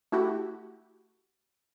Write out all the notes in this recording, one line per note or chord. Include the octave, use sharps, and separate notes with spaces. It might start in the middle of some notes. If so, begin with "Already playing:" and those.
A3 E4 F#4 G4